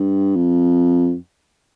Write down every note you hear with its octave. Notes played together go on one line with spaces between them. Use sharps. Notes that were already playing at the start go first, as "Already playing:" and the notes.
Already playing: G2
F2